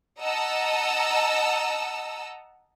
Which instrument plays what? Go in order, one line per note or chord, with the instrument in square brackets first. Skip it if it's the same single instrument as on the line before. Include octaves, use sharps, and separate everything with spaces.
[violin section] D#5 F#5 A5 A#5 E6